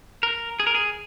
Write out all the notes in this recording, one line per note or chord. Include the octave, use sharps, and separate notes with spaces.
A#4
G#4
A#4
G#4